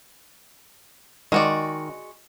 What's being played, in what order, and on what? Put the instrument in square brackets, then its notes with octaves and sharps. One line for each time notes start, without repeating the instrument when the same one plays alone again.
[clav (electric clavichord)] D#3 [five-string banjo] G#3 F#4 D5